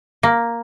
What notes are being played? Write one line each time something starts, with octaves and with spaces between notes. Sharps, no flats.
A#3